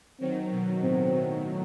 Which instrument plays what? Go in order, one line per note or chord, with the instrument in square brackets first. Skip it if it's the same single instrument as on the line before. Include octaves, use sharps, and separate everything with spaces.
[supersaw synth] D#3 F#3 [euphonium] C4
[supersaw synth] B2
[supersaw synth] A2 [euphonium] C4
[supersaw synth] B2